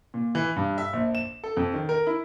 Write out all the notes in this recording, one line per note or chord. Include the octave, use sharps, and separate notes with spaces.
A#2
E3
G2
E5
A#1
E7
A4
F2
D#3
A#4
E4